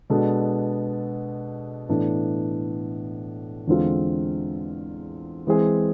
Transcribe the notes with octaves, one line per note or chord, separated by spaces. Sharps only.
B2 G#3 B3 D4 A4
A2 E3 B3 D4
E2 D3 G#3 C4 F4
E3 G#3 C4 G#4